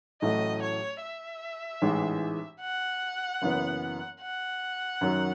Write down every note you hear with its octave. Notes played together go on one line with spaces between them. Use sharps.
A1 A2 F#3 A3 D#5
C#5
E5
A1 G#2 E3 G#3
F#5
F#1 F#2 E3 B3
F#5
F#2 D#3 F#3